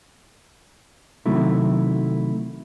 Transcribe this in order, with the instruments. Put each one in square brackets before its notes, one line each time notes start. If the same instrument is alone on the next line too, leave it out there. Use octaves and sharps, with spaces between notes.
[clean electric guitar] C3 D#3 F#3 A3 E4